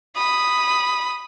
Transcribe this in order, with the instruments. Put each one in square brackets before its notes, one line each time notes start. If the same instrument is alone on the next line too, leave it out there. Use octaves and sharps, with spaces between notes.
[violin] B5 [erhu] D#6